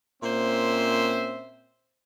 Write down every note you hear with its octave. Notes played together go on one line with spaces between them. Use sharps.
A#2 C4 C#4 C5 E5 C6